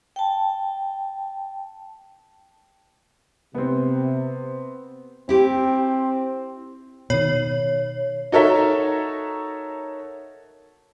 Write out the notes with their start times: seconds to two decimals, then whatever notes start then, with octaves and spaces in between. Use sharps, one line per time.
0.16 G5 A5
3.54 C3 B3 C4
5.29 C4 E4 G4
7.10 B2 D#3 C#5
8.32 D#4 F#4 A4 A#4 C#5 E5